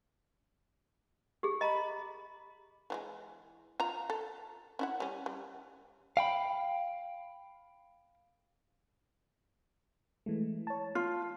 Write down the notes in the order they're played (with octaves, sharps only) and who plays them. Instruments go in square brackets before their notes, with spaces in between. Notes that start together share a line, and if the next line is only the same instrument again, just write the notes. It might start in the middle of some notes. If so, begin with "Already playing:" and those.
[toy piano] G4 G#4
[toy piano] D#5 A#5 [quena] B5
[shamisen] E3 G3 G#3
F4 A#5
A4
C#4 E4 F#5
G3 C#4
G3
[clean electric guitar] F5 G5 B5
[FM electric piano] E3 G#3 A3
C#5 A5
[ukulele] F4